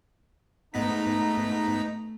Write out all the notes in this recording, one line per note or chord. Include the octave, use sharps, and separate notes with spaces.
G#2 A3 B3 D#4 A#5 B6